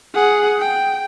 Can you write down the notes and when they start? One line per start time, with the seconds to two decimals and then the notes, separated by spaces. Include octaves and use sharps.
0.14 G#4 F#5
0.59 G5